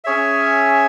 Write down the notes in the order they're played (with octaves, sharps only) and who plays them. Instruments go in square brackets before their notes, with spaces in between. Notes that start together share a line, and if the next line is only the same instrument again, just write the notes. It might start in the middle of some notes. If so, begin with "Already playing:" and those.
[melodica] C#4 G#4 C#5 E5